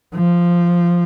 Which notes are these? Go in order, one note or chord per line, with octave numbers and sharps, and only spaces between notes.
F3